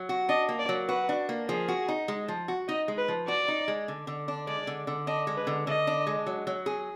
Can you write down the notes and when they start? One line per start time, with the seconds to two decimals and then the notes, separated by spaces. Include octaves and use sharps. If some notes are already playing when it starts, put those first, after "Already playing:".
Already playing: F#3
0.09 F#4
0.29 D4 D#5
0.49 A#3
0.59 D5
0.69 F#3
0.88 F#4 B4
1.09 D4
1.29 A#3
1.48 F3 G#4
1.68 F#4
1.88 D#4
2.08 G#3
2.28 F3
2.48 F#4
2.68 D#4 D#5
2.88 G#3
2.98 B4
3.08 F3
3.28 F#4 D5
3.48 D#4
3.68 G#3
3.88 D3
4.07 D3
4.28 D4
4.47 G#3 D5
4.67 D3
4.87 D3
5.07 D4 D#5
5.27 G#3
5.37 B4
5.47 D3
5.67 D3 D#5
5.87 D4
6.07 G#3
6.27 F#3
6.47 F#3
6.66 G#4